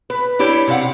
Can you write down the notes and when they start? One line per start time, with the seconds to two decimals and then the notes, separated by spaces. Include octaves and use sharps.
0.10 B4
0.39 D4 E4 G4 C#5
0.68 C3 C#4 D#4 F5 F#5